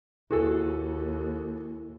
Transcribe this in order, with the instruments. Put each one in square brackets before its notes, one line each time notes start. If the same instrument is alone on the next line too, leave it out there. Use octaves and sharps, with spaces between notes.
[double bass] D#2 [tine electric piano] E4 [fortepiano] F#4 G#4 A4